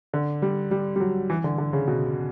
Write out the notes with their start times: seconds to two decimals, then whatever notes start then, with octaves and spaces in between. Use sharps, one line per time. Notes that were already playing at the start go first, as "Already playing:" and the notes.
0.13 D3
0.42 G3
0.71 G3
0.96 G3
1.00 F#3
1.30 E3
1.44 D3
1.58 D3
1.73 C#3
1.88 B2